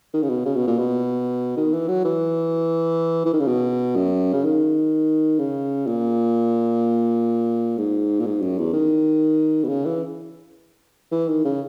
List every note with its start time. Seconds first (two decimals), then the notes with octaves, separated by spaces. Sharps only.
0.14 D#3
0.23 C#3
0.29 B2
0.45 C#3
0.56 B2
0.67 A#2
0.79 B2
1.57 D#3
1.73 E3
1.88 F#3
2.05 E3
3.26 E3
3.33 D#3
3.40 C#3
3.48 B2
3.96 F#2
4.33 C#3
4.44 D#3
5.39 C#3
5.87 A#2
7.78 G#2
8.20 A#2
8.26 G#2
8.41 F#2
8.58 E2
8.73 D#3
9.64 B2
9.69 C#3
9.86 E3
11.12 E3
11.28 D#3
11.44 C#3